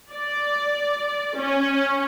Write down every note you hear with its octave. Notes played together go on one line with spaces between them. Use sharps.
D5
C#4